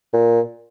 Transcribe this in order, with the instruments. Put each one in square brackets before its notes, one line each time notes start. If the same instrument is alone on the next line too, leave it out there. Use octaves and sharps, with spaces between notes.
[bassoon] A#2